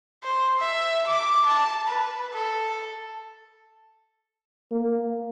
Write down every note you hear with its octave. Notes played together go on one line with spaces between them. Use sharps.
C5
E5
D6
A5
B4
A4
A#3